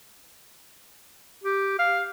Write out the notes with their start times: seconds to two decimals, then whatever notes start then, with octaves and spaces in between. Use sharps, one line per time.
1.44 G4
1.79 F5